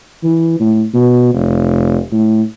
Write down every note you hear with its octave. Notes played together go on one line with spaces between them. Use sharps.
E3
A2
B2
F1
A2